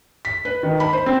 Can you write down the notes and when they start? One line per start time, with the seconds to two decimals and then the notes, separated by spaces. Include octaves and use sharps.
0.25 B6
0.45 B4
0.63 D#3
0.80 B5
0.93 C5
1.06 C4